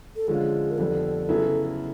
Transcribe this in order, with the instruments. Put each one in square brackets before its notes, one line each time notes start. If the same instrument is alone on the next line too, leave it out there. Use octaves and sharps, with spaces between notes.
[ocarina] A4
[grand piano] D3 F3 G#3 C#4 F4 [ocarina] G#4
[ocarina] A#4
[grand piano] F2 D3 G3 B3 [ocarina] A4
[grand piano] C#3 F#3 B3 E4